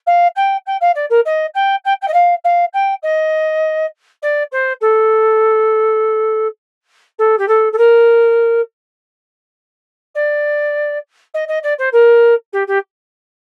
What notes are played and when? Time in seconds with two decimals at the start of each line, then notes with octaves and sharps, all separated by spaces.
0.07 F5
0.36 G5
0.66 G5
0.81 F5
0.95 D5
1.10 A#4
1.25 D#5
1.54 G5
1.85 G5
2.02 G5
2.08 D#5
2.13 F5
2.44 F5
2.73 G5
3.03 D#5
4.22 D5
4.52 C5
4.81 A4
7.18 A4
7.38 G4
7.48 A4
7.72 A4
7.78 A#4
10.15 D5
11.34 D#5
11.48 D#5
11.63 D5
11.78 C5
11.92 A#4
12.53 G4
12.67 G4